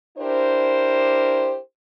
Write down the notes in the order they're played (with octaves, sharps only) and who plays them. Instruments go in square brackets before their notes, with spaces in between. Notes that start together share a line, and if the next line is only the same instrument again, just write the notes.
[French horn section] D4 E4 G4 A#4 C5